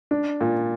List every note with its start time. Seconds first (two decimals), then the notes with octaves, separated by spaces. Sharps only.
0.11 D4
0.41 A#2